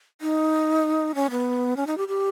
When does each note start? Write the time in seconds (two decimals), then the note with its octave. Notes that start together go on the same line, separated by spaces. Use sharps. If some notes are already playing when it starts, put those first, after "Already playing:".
0.21 D#4
1.15 C#4
1.30 B3
1.77 C#4
1.87 D#4
1.98 G4
2.08 G4